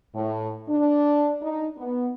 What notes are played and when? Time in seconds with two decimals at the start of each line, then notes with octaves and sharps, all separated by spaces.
0.15 A2
0.70 D4
1.42 D#4
1.78 B3